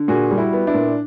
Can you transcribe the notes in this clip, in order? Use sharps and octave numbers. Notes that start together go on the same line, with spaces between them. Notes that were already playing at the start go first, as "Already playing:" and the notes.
Already playing: D3
A#2 F#4 G#4
G3
E4 F#4
B3
D4 E4
A#2